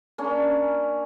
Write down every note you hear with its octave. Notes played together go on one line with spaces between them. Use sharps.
A#3 C#4 D4